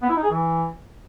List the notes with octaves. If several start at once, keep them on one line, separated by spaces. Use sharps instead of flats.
B3
E4
D#4
G#4
E3